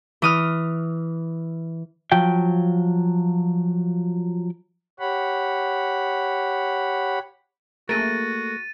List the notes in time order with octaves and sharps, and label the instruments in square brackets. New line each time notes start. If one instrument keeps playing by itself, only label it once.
[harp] E3 D#6 F6
[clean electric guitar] F3 F#3 G5
[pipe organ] G4 C#5 F#5 B5
[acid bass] A3 [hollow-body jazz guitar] A#3 G#4 A#4 [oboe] F#4 [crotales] A6 D#7